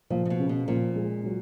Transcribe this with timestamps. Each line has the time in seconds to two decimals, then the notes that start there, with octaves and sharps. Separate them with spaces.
0.10 A#2 F3
0.25 C#3
0.30 B2
0.39 C#3
0.49 B2
0.68 A#2 F3
0.95 G#3
1.24 F#3